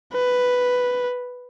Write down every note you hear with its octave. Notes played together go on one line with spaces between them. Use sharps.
B4